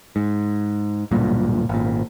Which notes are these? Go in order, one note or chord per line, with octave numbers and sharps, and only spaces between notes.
G#2
D1 B1 G2 A#2
G#1 A#2